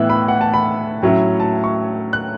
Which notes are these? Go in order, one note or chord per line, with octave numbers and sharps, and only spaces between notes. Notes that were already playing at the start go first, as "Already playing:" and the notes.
Already playing: A2 E3 B3 E4 E6 F#6
B5
F#5
A5
B5
A2 F#3 C#4 E4
A5
C#6
F#6